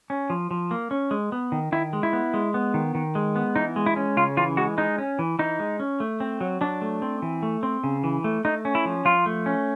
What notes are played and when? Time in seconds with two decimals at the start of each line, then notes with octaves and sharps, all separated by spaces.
0.10 C#4
0.30 F3
0.51 F3
0.71 A#3
0.91 C#4
1.11 G#3
1.32 B3
1.52 D#3
1.72 D#3 E4
1.93 G#3
2.03 E4
2.13 B3
2.34 G#3
2.54 B3
2.74 D#3
2.95 D#3
3.15 G#3
3.36 B3
3.56 E3 D#4
3.76 G#3
3.86 E4
3.96 C#4
4.17 C#3 F4
4.37 E3 F4
4.57 G#3 F#4
4.78 G#3 D#4
4.98 C#4
5.19 E3
5.39 E3 D#4
5.59 G#3
5.80 C#4
6.00 A3
6.20 C4
6.41 F#3
6.61 F#3 D4
6.82 A3
7.02 C4
7.22 E3
7.43 A3
7.63 C4
7.84 C#3
8.04 E3
8.24 A3
8.45 A3 D#4
8.65 C#4
8.75 E4
8.85 F3
9.05 F3 F4
9.26 A3
9.46 C#4